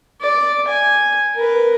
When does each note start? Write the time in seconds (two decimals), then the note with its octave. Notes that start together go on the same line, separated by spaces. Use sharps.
0.21 D5
0.68 G#5
1.36 A#4 B4